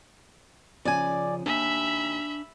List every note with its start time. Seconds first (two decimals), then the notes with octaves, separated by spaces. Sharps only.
0.85 C#3 F3 C#4 D5 G#5
1.46 D#2 D4 E5 G#5 B5